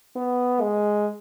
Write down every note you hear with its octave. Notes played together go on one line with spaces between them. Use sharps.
B3
G#3